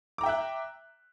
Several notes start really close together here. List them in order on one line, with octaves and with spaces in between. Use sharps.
D6 A#5 G5 E5 F#6